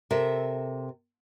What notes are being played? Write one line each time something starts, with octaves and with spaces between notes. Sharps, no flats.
C3 A4 A#4 E5